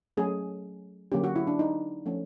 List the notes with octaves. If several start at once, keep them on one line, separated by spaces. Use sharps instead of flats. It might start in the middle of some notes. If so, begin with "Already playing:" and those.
F#3 A3 C#4 G#4
D3 F#3 A#3 C#4 G4
F#4
E4
D4
D#4
F3 A3 C#4